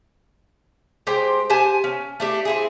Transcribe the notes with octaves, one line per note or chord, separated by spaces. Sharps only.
G#3 G4 C5 G5
G4 C5 G#5 A5
C#4
A3 D4 G4
C4 E4 G#4